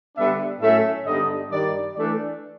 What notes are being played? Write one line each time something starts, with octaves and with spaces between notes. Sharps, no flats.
D3 G3 B3 D4 E5
A2 F#3 A3 C#4 E5
G2 D3 G3 B3 D#4 D#5
G2 D#3 G3 D5
E3 A3 D4 D5